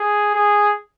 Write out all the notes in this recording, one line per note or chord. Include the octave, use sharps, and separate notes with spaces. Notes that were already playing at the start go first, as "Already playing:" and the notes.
Already playing: G#4
G#4